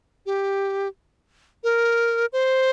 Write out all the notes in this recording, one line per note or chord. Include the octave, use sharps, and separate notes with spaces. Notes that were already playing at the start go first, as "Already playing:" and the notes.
G4
A#4
C5